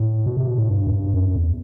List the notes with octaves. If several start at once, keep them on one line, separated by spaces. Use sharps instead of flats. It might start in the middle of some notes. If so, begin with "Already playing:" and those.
Already playing: A2
B2
C3
B2
A2
G2
F#2
G2
F#2
E2